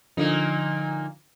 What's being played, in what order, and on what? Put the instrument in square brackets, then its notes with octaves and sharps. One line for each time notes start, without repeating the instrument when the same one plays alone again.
[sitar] A#2 A#3 D#4 [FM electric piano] D3 F3